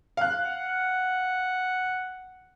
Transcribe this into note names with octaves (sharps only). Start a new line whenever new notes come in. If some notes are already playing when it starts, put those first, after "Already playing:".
F5 F#6
F#5